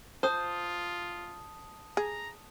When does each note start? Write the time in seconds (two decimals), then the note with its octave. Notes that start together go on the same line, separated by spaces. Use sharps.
0.23 F4 C5 A5 D#6
1.97 G#4 A#5